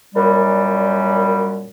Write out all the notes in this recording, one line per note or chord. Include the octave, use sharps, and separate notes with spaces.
F#2 A#2 G3